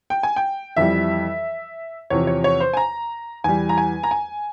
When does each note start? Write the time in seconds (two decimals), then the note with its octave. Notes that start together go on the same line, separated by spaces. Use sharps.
0.10 G5
0.23 G#5
0.36 G5
0.76 F2 E3 G3 E5
2.10 E2 C3 F3 C#5
2.27 C#5
2.44 C#5
2.60 C5
2.73 G#5
2.77 A#5
3.44 E2 E3 G3 G#5
3.69 A#5
3.78 G#5
4.03 A#5
4.11 G#5